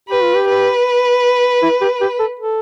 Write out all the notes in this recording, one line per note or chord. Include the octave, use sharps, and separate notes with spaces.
G4 B4
F4
G4
B4
E4
G4
G4
A4
A4